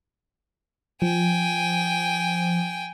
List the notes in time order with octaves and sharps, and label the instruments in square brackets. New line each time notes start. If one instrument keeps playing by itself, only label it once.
[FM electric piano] F3 [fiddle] G5 G#5